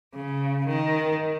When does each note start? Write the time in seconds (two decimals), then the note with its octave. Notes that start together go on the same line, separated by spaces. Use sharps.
0.15 C#3
0.67 D#3